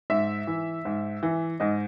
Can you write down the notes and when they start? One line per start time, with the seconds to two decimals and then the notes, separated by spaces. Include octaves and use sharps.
0.10 G#2 E5
0.47 E3
0.85 G#2
1.23 E3
1.60 G#2 D#5